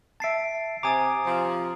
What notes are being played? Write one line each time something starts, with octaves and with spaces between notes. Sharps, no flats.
E5 A5 A6 C7 D7
C3 G#5 A#5 D6 D#6 A6
C3 F3